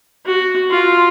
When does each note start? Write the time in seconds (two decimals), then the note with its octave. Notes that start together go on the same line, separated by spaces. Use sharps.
0.26 F#4
0.70 F4